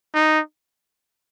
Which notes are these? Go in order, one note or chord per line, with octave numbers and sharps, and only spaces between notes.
D#4